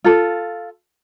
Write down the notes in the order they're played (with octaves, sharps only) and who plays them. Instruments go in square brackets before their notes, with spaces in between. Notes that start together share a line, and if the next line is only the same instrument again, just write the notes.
[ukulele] F4 A4